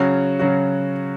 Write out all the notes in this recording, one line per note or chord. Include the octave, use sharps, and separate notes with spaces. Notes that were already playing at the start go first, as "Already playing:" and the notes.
Already playing: C#3 F#3 C#4 F#4
C#3 F#3 C#4 F#4